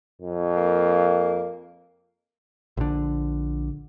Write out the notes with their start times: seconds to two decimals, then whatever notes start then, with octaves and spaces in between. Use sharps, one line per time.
0.22 F2
0.57 A#3
2.77 A#1 D3